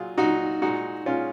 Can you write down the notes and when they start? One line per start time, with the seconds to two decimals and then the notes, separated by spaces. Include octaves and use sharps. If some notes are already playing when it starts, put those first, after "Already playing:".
Already playing: A#2 F#3 F4 G#4
0.18 A#2 F#3 D#4 F#4
0.62 A#2 G#3 D#4 F#4
1.06 A#2 G#3 C#4 F4